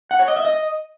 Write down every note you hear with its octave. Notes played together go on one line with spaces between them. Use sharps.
F#5
C#5
D#5
E5
D#5